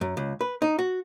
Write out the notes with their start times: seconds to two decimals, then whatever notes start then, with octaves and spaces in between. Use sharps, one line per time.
0.01 F#2
0.17 C#2
0.41 B4
0.62 D#4
0.79 F#4